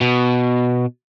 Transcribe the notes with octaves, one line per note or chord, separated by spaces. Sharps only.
B2